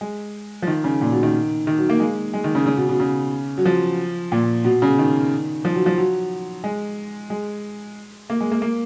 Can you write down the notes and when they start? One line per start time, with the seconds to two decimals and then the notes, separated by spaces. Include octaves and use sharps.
0.01 G#3
0.62 F3
0.67 D#3
0.84 C#3
1.01 A#2
1.12 B2
1.23 D#3
1.67 D#3
1.78 F#3
1.90 A#3
2.00 G#3
2.33 G#3
2.44 D#3
2.55 C#3
2.66 C#3
2.77 B2
2.89 B2
3.00 C#3
3.58 F#3
3.65 F3
4.32 A#2
4.65 B2
4.82 C#3
4.99 D#3
5.65 F3
5.75 F#3
5.86 F3
5.98 F#3
6.64 G#3
7.30 G#3
8.30 A#3
8.41 G#3
8.52 A#3
8.62 A#3